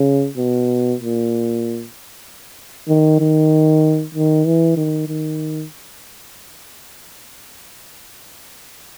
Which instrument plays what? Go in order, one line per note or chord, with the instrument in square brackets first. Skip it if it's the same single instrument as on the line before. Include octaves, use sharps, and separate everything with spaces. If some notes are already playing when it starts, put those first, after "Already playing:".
Already playing: [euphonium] C#3
B2
A#2
D#3
D#3
D#3
E3
D#3
D#3